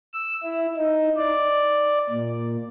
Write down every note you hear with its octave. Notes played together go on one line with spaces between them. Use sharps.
E6
E4
D#4
D5
A#2